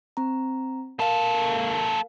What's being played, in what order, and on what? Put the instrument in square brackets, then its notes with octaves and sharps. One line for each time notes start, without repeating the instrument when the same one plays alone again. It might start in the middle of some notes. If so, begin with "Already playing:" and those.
[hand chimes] C4 A#5
[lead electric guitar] A#3 A4 [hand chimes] A#4 F5